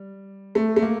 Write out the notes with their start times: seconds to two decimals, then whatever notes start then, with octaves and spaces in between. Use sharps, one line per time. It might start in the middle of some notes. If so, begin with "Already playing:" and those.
Already playing: G3
0.55 A3
0.76 A3
0.82 A#3